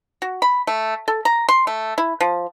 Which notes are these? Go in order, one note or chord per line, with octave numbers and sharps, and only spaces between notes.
F#4
B5
A3
A4
A#5
C6
A3
E4
F3